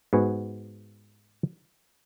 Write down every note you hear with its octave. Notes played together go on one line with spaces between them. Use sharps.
G#2 B3 F#4 G#5